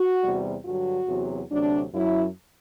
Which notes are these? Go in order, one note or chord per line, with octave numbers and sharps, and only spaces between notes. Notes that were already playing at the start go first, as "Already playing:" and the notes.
Already playing: F#4
E2 C3 G3
G2 D3 F#3 F#4
E2 C3 F#3
D2 C3 F#3 D4
F#2 F#3 E4